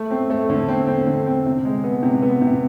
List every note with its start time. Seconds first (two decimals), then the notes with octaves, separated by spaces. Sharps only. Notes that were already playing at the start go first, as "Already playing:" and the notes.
Already playing: A3
0.10 C4
0.30 A3
0.50 D3
0.68 C4
0.87 C4
1.06 D3
1.26 C4
1.46 C3
1.65 G#3
1.84 B3
2.03 C3
2.22 B3
2.41 C3